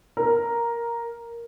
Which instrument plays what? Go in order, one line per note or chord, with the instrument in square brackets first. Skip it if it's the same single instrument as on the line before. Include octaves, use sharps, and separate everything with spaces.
[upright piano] A#4